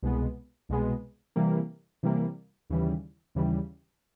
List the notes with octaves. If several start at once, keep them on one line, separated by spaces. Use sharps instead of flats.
C2 B2 G#3 B3
C2 B2 G#3 B3
C3 E3 G3 A#3
C3 E3 G3 A#3
D#2 C#3 E3 G3
D#2 C#3 E3 G3